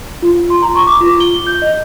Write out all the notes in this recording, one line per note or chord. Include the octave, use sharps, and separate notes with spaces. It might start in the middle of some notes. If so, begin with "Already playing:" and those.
F4
C6
A#5
C#6
D6
F4
G7
G6
D#5